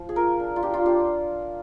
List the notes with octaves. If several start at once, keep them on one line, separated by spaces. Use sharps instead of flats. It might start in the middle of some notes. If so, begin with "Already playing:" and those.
Already playing: F3
G#4
F4 A#4
D4
F4
D4 G4
F4
D4 G4